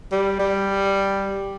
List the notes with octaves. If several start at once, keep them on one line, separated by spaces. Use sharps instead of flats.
G3
G3